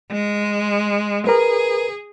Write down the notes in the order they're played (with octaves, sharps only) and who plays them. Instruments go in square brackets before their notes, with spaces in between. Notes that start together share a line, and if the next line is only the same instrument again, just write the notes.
[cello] G#3
[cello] G#4 [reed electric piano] A#4 B4